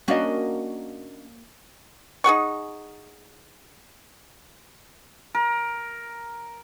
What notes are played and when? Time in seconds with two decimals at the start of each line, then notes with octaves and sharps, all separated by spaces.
0.08 A#3 C#4 D4 F#4 D#5
2.24 D#4 G#4 F#5 C#6
5.35 A#4